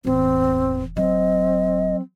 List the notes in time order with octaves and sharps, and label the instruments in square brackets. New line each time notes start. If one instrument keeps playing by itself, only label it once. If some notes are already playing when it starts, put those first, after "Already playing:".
[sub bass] E1 [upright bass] A1 E2 [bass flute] C4
[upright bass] F#3 [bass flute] C4 [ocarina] D#5